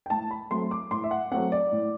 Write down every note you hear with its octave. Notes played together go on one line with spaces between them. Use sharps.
G5
A2 A5
B5
F#3 A3 C4 C6
D6
A2 C6
E5
F#5
F#3 A3 C4 F#5
D5
A2